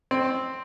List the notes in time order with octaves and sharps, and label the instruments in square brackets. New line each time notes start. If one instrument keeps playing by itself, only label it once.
[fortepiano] C4